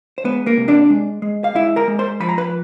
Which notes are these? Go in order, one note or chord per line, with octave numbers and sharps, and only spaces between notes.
C5
G#3 B3 B4
A#3 A#4
C3
D4 D5
G#3
G#3
F5
G#3 E4 E5
A#4 A#5
G#3
C5 C6
F3 B5
A#5
B4 B5